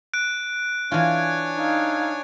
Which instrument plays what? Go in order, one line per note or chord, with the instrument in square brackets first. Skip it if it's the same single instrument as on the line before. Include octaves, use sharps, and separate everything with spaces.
[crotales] F#6 D7
[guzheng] E3 F4 [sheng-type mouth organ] D4 C#5 G#5
[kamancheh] D#4 F5